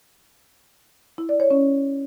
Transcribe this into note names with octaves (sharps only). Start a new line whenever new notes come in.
E4
D5
C#5
C#4